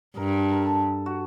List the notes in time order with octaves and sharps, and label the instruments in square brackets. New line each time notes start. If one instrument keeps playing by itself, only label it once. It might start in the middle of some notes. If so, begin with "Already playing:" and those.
[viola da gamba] G2 [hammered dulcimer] A#4
[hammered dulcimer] A#4
A4
F#4